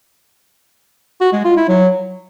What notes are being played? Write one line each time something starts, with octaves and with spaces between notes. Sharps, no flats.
F#4
G#3
F4
E4
F#3